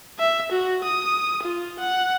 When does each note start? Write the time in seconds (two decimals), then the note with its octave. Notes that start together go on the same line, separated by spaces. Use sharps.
0.19 E5
0.52 F#4
0.84 D#6
1.43 F4
1.79 F#5